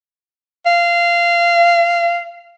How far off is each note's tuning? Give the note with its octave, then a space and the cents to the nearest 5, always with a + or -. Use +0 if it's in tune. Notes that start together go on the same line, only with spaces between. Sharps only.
F5 -15